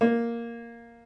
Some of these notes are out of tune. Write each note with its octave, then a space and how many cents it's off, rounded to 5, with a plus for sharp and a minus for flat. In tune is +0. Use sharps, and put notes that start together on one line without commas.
A#3 +0